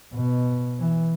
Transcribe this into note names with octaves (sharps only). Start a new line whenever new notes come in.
B2
E3